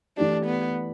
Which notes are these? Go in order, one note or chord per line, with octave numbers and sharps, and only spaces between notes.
E3 A3 D4 G4
B3